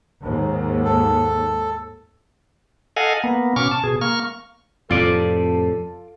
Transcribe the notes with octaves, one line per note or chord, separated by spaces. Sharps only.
D#2 G#2
A4
A4 D#5 F5 F#5 G#5
A#3 B3
B2 C#4 C#6 D6 F6
A5
B2 G#4
A#3 C#6 F6
F2 A2 C3 F4 A4 D5